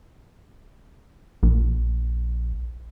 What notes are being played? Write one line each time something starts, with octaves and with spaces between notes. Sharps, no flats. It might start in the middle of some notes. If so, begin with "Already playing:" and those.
A#1